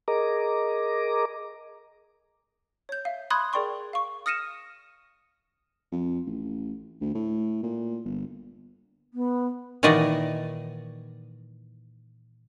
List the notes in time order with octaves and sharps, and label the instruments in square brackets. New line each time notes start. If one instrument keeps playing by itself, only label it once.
[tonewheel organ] G#4 A#4 D#5 A#5 D6
[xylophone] C#5 G6
E5 F5
B5 C6 D#6 F#6 G#6
G#4 A#4 D5 G5 C6 C#6
F5 C#6
D#6 F6 A#6 C#7 D#7 E7
[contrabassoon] F2
A1
D2
A2
A#2
G1
[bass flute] B3
[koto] A#2 D#3 E3 F#4 D5 D#5